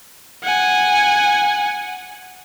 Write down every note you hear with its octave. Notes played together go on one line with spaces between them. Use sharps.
F#5 G#5